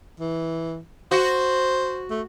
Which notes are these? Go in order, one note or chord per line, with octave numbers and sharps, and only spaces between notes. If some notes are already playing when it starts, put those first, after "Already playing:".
E3
F#4 C5
A3